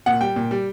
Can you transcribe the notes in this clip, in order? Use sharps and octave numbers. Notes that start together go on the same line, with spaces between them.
A#2 F#5
G3 G5
A#2
G3